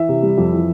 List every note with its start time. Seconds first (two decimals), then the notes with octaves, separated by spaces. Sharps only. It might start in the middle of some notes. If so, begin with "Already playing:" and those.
Already playing: E3 E5
0.09 C3
0.23 G3
0.38 F2
0.52 E3